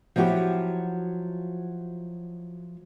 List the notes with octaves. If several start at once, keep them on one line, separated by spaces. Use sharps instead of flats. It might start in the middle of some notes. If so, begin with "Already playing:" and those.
F3 F#3 E4 F#4 G4